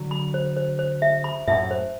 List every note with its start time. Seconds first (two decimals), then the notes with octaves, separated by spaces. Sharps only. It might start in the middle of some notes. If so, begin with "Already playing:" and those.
Already playing: D3 F#3
0.11 B5
0.34 C5
0.57 C5
0.79 C5
1.02 E5
1.24 B5
1.47 F#2 A2 E5
1.71 C5